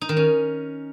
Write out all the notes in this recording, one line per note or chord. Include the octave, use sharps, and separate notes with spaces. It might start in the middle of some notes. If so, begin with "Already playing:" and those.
D#4
D#3
C#4